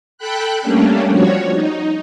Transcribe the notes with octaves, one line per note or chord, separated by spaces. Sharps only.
A4 G5 B5 F#6
G3 A3 A#3 C#4 D4
F3 G3 F#4 C#5
D#4